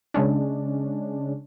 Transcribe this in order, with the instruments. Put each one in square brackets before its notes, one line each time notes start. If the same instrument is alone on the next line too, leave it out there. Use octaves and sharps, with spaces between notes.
[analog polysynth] C#3 G#3 C#4 D4